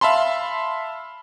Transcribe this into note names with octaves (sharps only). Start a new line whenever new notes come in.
E5 F5 A5 B5 C6